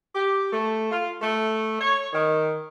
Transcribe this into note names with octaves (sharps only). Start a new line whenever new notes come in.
G4
A3
F4
A3
C#5
D#3